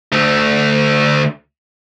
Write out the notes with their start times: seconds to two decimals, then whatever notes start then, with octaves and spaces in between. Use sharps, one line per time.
0.12 D2 A3